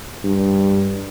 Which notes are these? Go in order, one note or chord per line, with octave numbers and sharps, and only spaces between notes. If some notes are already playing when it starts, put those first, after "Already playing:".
G2